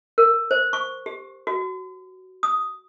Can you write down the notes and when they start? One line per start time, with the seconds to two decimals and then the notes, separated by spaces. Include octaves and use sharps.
0.18 A#4
0.51 C5
0.73 C#6
1.06 G4
1.47 F#4
2.43 D#6